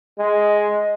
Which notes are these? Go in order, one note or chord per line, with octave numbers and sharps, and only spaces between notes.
G#3 D#5